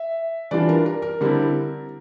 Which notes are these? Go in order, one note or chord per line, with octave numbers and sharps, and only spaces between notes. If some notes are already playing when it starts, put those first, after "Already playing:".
Already playing: E5
E3 G3 D4 F4 D5
A#4
A#4
A#4
D3 G3 C4 E4